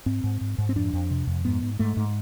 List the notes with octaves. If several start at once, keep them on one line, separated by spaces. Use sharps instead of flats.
G#2 C4
G#2
G#2
G#2
C4
F2 D4
F2
C3
F2
G#2 B3
G#2
G#2 A3
G#2